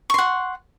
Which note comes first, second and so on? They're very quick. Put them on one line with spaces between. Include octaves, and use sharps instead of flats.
C#6 C6 F#5